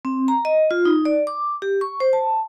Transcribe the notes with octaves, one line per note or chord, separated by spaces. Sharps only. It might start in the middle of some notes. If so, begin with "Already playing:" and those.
C4
A#5
D#5
F4
D#4
D5
D6
G4
C#6
C5
A5